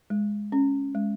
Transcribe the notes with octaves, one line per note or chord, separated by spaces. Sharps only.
G#3
C#4
G#3